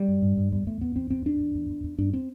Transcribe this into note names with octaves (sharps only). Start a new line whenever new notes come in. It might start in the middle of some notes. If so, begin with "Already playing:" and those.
Already playing: G3
F#2
G2
G2
E2 G3
E2 A3
E2 B3
E2 C4
E2 C4
E2 D4
E2
E2
E2
E2
G2 D4
C4